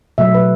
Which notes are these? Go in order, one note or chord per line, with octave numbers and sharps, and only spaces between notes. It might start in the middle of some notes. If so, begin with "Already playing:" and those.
B2 F#3 A3 E5
B4